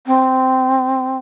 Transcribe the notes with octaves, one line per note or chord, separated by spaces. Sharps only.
C4